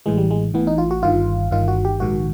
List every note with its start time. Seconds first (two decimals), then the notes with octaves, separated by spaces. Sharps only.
0.06 A1 A2 E3 G#3
0.17 G3
0.31 G#3
0.54 A1 A2 E3 B3
0.67 D#4
0.78 F4
0.91 F#4
1.03 G1 G2 D#3 F4
1.51 G1 G2 D#3 F4
1.68 F#4
1.85 G4
2.00 A#1 G#2 D#3 F#4